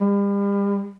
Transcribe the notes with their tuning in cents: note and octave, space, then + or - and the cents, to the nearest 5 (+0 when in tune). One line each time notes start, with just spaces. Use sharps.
G3 +40